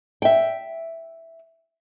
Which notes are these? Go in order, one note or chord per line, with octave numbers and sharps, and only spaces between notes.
E5 G5